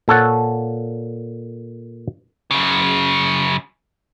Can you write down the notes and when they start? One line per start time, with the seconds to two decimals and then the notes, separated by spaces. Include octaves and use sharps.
0.08 A#2 A4 C#5 F#5
2.51 F#2 C#3